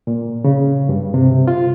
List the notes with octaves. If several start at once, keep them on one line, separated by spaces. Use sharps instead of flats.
A#2
C#3
G2
C3
F4